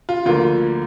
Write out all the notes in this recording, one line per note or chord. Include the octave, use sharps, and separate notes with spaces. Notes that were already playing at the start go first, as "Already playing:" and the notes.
F4
D2 D3 F3 A#3 F4